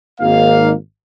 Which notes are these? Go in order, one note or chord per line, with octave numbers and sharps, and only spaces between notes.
G#1 A#3 D#4 F5